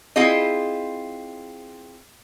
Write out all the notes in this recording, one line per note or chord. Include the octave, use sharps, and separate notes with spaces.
C4 E4 F4 G#4 D#5